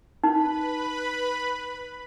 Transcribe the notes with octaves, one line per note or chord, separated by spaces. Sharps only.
D#4 B4 B5